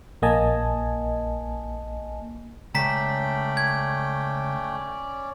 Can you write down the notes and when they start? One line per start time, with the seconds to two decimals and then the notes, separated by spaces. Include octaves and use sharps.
0.22 A#1 A#3 D#5 G#5 A5
2.75 C#2 A3 C#4 D5 G5 A#5 B6
3.57 G#6